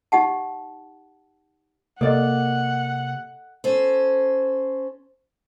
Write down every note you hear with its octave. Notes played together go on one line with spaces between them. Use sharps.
D#4 G4 F#5 A5
C3 A#3 A4 D5 D#5 F#5
C#4 A4 C5